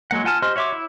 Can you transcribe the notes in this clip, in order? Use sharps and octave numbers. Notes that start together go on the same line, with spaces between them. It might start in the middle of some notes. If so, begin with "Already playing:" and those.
F#3 G#3 A#3 F#5
F4 F#5 G#5 A5 F6
G4 C5 D#5 C6 F6
F#4 C#5 E5 C6 D6
E4